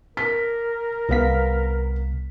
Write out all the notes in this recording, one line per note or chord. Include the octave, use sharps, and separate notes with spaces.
A#4 B6
C2 B3 F5 B6